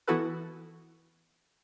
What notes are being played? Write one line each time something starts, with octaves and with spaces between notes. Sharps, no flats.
E3 B3 E4 F#4 A4 B4